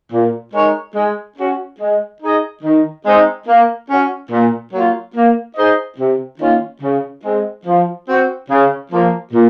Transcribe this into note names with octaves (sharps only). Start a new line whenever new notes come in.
A#2
G#3 D#4 A#4 C#5
G#3
C#4 F#4
G#3
D#4 G#4 D#5
D#3
G#3 C4 D#4
A#3
C#4 F#4
A#2
F#3 A#3 F4
A#3
D#4 G#4 C5 D#5
C3
D#3 A#3 C#4 F4
C#3
G#3 C4
F3
C4 F#4
C#3
F3 A#3
A#2